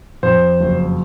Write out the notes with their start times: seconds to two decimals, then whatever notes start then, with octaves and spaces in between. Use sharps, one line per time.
0.23 F2 C5
0.61 F#1